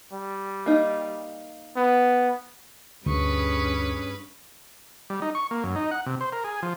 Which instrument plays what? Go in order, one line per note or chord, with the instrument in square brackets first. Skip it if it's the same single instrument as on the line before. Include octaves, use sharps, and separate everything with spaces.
[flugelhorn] G3
[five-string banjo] A#3 D#4
[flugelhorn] B3
[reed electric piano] D2 [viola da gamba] G2 C#4 B4 [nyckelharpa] G#4 C#6
[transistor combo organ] G3
D#4
C#6
A#3
F#2
D#4
F#5
C3
C5
A#4
G#4
F3